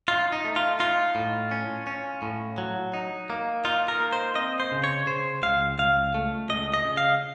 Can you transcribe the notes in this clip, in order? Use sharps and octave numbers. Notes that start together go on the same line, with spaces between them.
D#4 F4
D#4
A3
F4
D#4 F4
A2
C#4
C#4
A2
F#3
D#4
A#3
D#4 F4
A#4
A#3
C5
C4 D#5
C5
C#3
C#5
C#3 C5
C#2 F5
C#2 F5
A3
C#2 D#5
D#5
C#3
F5